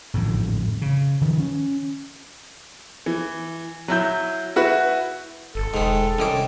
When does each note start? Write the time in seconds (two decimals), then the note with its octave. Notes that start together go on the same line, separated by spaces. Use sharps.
0.14 A1 F2 G#2 D3
0.82 C#3
1.21 D#3 F3
1.40 C#4
3.06 E3
3.88 F#3 E4 G6
4.56 E4 F#4 B4
5.55 G1 A4
5.74 E1 G#2 D#3
6.18 C2 D#3 C#4 D6